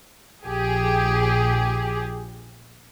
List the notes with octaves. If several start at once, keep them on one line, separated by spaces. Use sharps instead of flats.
A#1 G4 G#4